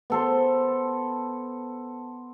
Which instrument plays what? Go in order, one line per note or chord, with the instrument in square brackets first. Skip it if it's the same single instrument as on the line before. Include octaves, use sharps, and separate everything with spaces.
[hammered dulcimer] B3 A4 C5